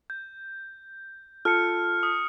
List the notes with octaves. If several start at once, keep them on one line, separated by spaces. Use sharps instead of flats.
G6
F4 A4 A5 F6 C#7
D#6